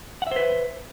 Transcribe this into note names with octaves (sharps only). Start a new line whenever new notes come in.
B4 C5 E5 F#5